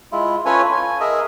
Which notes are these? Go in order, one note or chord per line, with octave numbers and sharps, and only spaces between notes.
G#3 E4 F4
C#4 F4 A4 B4 C#5 G#5
G#5
G#4 A#4 D#5 E5